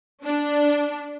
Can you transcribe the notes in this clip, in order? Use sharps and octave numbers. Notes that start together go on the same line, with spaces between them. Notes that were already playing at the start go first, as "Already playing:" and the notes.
D4